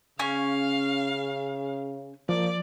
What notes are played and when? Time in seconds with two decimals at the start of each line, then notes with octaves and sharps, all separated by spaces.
0.19 C#3 C#4 F5 G#5
2.29 F3 A#3 D5